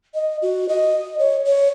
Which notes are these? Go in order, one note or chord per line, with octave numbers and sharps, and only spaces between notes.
D#5
F#4
D#5
C#5
C#5